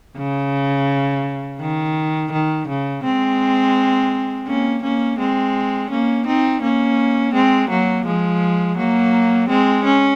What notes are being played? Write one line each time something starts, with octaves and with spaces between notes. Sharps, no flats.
C#3
D#3
D#3
C#3
G#3 C4
A#3 C#4
A#3 C#4
G#3 C4
A#3 C#4
C4 D#4
A#3 C#4
G#3 C4
F#3 A#3
F3 G#3
F#3 A#3
G#3 C4
C#4